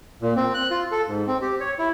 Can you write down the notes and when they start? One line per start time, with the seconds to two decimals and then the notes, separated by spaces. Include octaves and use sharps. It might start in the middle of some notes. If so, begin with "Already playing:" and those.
0.22 A#2
0.36 C4
0.54 F#6
0.71 F4
0.91 A4
1.08 G#2
1.27 C4
1.41 G4
1.60 C#5
1.79 E4